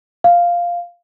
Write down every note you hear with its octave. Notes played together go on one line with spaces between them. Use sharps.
F5